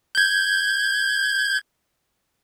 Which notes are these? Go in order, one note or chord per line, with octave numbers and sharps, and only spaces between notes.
G6 G#6